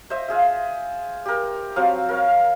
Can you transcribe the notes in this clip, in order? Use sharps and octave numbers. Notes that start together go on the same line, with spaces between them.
C5 D#5 E5
F4 G#4 E5
G4 A#4
F3 F#3 C4 F5
A#4 C#5 F5